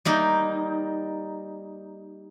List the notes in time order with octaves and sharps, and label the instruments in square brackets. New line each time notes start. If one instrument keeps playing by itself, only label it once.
[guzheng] G3 A#3 D#4